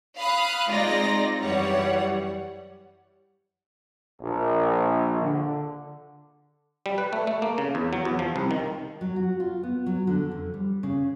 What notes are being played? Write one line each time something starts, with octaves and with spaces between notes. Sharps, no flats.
F5 B5 D#6 F#6
G#3 C4 D#4 F4 D5 A#6
F#2 E3 G3 C#5 F#5
A#1
D3
G3
B4
A3
A3
A#3
C#3
E2
F#3
E2
F3
C2
D#3
F#3
F#4
F4
B3
F#3
D3
F2
G3
C#3